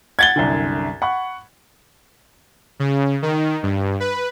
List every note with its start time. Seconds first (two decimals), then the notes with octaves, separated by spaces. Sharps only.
0.19 F#5 G#6 A6 G7
0.36 C2 F#2 D3
1.02 F#5 B5 C#6
2.80 C#3
3.22 D#3
3.63 G2
4.00 B4